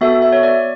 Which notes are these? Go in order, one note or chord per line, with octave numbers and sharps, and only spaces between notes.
B3 F#4 A4 E5
E5
C#5
D5